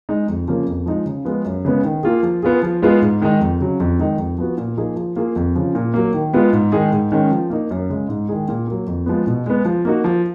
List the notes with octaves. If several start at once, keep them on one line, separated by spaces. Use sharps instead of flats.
G#3 D#4
F2
C#3 F3 A#3
F2
F3 G#3 D#4
C#3
F3 G#3 B3 F4
F#2
C#3 G#3 B3
D#3
A#3 F4 G#4
F3
B3 F4 G#4
F3
G#3 B3 F4 G#4
G#2
D#3 G#3 D#4
F2
C#3 F#3
F2
D#3 G#3 D#4
F2
F3 B3 F#4
A#2
F3 A#3 D#4 G#4
F3
A#3 F4 G#4
F2
C#3 F3
A#2
F#3 A#3
D#3
G#3 B3 F4
G#2
D#3 G#3 D#4 G#4
G#2
D#3 G#3 C#4
F3
A#3 D#4
F#2
C#3 G#3
G#2
D#3 G#3 D#4 G#4
A#2
F#3 A#3
F2
F3 G#3 B3
B2
G#3 B3
F3
A#3 D#4 F#4
F3